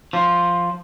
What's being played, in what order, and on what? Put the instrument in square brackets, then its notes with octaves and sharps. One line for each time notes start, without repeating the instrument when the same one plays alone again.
[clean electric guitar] F3